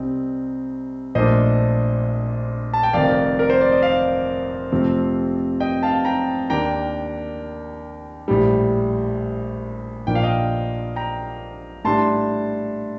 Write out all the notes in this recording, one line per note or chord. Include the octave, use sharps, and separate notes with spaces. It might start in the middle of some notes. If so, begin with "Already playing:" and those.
Already playing: C2 C3 G3 C4 D#4
A#1 A#2 A3 D4 C5 D#5
A5
G5
F1 F2 D#3 D5 F5
A#4
C5
D5
D#5
D5 F5
F2 C3 F3 A3 C4
D#5 G5
F5 A5
G5 A#5
D#2 D#3 A#3 D4 G5 A#5
A#1 A2 G3
A#1 A#2 F3 A#3 D4 G5
F5
D#5 G5
G5 A#5
A2 G3 D4 A5 C6